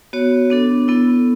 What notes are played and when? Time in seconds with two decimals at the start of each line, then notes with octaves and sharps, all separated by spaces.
0.13 B3 F#4 C#5
0.50 B3 D4 A4
0.88 B3 E4 A4